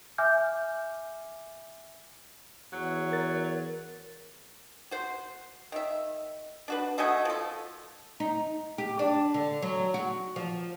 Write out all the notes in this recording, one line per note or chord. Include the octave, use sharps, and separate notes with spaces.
E5 G#5 D6 F6 G6
E2 F#3
A#4 A6
F#4 C5
D#3 E5
D4 F#4 B4
A3 F#4 D#5 G#5
F3 A4
D#4
G4
D4
D3
F#3
F#4
F3